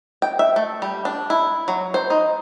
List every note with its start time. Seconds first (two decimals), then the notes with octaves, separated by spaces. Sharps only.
0.22 G5
0.39 E5
0.56 A3
0.82 G3
1.05 D4
1.30 E4
1.68 F#3
1.94 C5
2.10 D#4